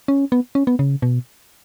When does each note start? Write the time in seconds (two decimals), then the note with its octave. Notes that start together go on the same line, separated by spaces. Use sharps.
0.08 C#4
0.32 B3
0.55 C#4
0.67 B3
0.79 C#3
1.02 B2